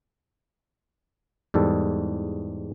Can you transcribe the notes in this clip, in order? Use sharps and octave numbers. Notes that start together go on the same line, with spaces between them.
E2 G#2 G3 A4